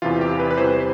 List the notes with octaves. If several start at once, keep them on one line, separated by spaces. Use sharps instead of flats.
E2 C3 E3 F4
G4
B4
B4
E2 C3 E3 G3 C5